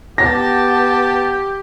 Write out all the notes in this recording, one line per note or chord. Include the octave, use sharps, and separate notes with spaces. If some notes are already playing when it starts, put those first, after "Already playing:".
B3 G4 A5 A#6